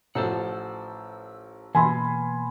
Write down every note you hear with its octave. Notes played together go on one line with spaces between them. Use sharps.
A1 F3 A4 C5 F#5 E6
B2 E3 A#3 G#5 B5 C6